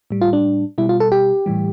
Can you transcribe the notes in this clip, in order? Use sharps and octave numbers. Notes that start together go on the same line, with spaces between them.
A2 G3
F4
D4
B2 G3 E4
F4
A4
G4
A2 E3 G3